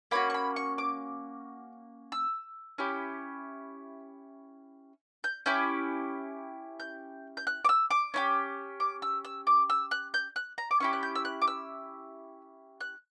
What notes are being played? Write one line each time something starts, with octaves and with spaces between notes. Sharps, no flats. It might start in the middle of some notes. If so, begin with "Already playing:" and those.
A#3 C#4 F#4 B5
C#6
B5
C#6
D6
E6
C#4 E4 G4
G6
C#4 E4 G4 G6
G6
G6
F#6
D6
E6
D6
C#4 E4 G4
D6
E6
E6
D6
E6
F#6
G6
F#6
A#5
D6
C#4 E4 G4 C#6
F#6
G6
E6
F#6
D6
E6
F#6